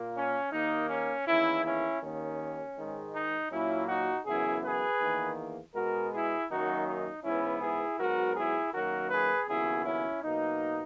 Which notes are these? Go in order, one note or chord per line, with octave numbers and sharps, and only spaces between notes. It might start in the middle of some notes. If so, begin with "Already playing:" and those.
Already playing: A#2 A#3
C#4
D#2 D#3 A#3 D#4
C#4
E2 D#3 A#3 C#4 E4
C#4 E4
D#2 D#3 A#3 C#4
G#2 D#3 G#3
D#4
A#2 F#3 A#3 C#4 E4
D#4 F#4
F#2 C#3 E3 B3 E4 G#4
G#4 B4
E2 D#3 A#3
B2 G#3 B3 F#4 A#4
E4 G#4
F#2 D#3 F#3 A#3 D#4 F#4
D#4
G#2 E3 B3 C#4 E4
E4 G#4
G#2 F#3 B3 F#4 A#4
E4 G#4
F#2 D#3 F#3 A#3 F#4 A#4
G#4 B4
D#2 C#3 F#3 B3 E4 G#4
C#4 E4
B2 F#3 A#3 D#4